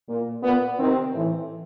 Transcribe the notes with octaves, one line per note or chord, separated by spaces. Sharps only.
A#2
A#2 B3
C3 D#3 C4
A2 E3